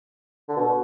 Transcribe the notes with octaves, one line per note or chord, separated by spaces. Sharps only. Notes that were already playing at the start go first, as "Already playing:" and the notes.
D3
B2